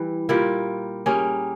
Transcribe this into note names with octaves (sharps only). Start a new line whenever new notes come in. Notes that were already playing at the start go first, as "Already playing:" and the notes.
Already playing: E3 G3 E4
A#2 G3 A#3 E4
G3 A#3 C#4 G#4